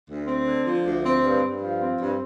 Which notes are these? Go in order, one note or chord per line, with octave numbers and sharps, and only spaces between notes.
D2
C4
D3
F3
D2
C4
G2
G2
F3
C4
G2